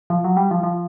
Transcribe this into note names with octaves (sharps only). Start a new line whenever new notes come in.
F3
F#3
G3
F3
F3